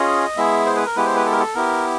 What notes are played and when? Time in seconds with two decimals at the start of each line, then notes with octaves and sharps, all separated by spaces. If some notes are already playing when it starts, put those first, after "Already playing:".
Already playing: C#4 F4 G#4 D#5
0.37 G#3 B3 E4 G#4 E5
0.66 C5
0.76 B4
0.86 A#4
0.96 G#3 B3 E4 G4 B4
1.06 C5
1.16 B4
1.25 A4
1.32 A#4
1.39 A4
1.55 B3 E4 G4 A#4